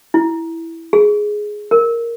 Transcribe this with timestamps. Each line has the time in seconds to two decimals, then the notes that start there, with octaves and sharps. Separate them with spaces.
0.14 E4
0.93 G#4
1.71 A#4